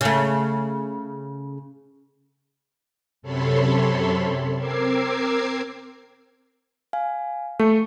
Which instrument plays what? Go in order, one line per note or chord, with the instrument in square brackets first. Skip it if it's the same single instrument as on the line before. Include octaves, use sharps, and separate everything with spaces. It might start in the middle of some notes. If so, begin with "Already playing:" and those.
[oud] C#3 A3
[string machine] F#2 C3 A4 C#5 B5 C6
C4 A#4 D6 E6 G#6 C7
[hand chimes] F5 G#5
[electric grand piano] A3 [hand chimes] C#6 C#7